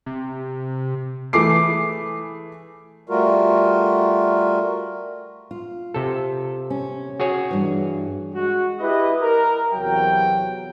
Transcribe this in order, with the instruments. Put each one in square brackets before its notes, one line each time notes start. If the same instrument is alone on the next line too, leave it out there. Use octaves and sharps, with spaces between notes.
[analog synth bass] C3
[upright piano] E3 A3 G#4 D6 C7
[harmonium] G3 A3 F4 F#4 A#4
[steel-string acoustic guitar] F4
[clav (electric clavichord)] C3 A4
[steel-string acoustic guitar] C#4
[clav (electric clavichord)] F#4 G#4 C#5
[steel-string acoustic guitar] G2 E3
[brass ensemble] G#3 F#4
E4 G4 B4 D#5
A#4
E2 C3 F#3 G5